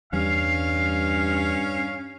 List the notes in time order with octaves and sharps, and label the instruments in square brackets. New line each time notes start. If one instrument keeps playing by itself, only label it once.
[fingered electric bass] E2 G3 [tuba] G2 [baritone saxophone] C#4 [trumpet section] F5